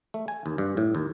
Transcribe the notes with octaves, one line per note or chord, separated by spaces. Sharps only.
A3
G#5
D#2
G2
A2
D#2